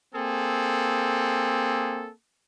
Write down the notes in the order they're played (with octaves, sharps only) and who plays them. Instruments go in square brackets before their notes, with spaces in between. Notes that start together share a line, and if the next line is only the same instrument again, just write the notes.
[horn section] A#3 C4 G#4 A4